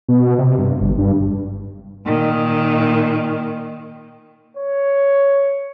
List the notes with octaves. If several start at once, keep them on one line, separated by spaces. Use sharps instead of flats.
B2
C3
G2
G1
G2
A#2 D#3
C#5